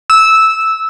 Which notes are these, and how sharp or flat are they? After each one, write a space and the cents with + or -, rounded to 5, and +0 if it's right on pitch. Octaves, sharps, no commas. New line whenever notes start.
E6 -10